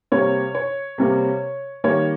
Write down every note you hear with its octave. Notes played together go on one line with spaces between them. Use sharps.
C3 G3 A#3 C#5
C#5
C3 G3 A#3
D#3 G3 A#3 C#5